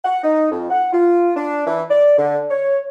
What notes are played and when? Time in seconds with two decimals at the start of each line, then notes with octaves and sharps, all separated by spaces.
0.05 F#5
0.23 D#4
0.51 F2
0.71 F#5
0.93 F4
1.36 D4
1.67 E3
1.90 D5
2.18 D3
2.50 C#5